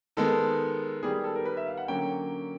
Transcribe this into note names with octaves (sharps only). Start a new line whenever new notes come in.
D#3 G#3 B3 A4
D#3 G3 B3 G#4
G#4
A4
A#4
B4
E5
F5
F#5
D3 F#3 A#3 C#4 G5